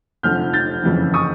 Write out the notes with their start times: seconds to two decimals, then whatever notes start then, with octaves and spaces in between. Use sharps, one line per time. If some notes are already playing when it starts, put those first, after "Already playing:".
0.23 F1 F2 D3 F3 F6 G6
0.53 G6 A6
0.84 F#1 F2 C#3 E3
1.14 C#6 D#6